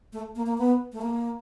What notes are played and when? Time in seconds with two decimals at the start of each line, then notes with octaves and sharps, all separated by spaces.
0.13 A3
0.36 A#3
0.46 A#3
0.58 B3
0.93 A3
1.02 A#3